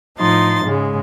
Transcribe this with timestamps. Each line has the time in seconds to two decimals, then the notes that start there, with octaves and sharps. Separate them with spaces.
0.18 A2 F3 D#4 C6 A6
0.63 G#2 C#3 G#3